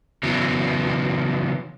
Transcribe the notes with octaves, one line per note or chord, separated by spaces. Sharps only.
C#3 E3 F#3 B3